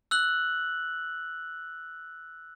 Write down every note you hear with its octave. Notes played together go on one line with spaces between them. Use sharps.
E6 F#6 F#7